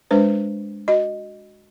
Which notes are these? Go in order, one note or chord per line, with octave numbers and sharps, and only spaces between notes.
G#3 D4 B4 C5
F#4 D#5